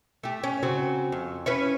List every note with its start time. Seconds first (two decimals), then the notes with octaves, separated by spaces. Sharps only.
0.23 A3 G4
0.44 C#4
0.63 C#3 F#3 C4
1.12 F2
1.46 C#4 E4 B4